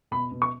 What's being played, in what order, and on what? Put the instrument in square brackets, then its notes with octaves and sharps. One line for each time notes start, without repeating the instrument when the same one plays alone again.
[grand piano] B2 B5
B2
C#6